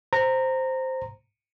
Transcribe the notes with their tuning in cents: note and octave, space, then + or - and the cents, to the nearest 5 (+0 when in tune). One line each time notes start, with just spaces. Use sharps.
C5 +0 A#5 -15